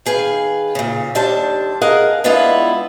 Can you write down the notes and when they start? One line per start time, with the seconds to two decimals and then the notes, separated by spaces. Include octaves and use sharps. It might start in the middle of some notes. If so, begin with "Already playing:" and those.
0.06 D#3 G#4 B4 F5
0.75 A#2 C#3
1.15 D#2 G3 D4 A4 C5 A5
1.81 G#4 A#4 D#5 F5 F#5
2.24 G#3 B3 D4 E4 F4